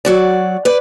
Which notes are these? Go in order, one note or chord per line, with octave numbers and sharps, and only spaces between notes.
F#3 F#4 D5
B4 D5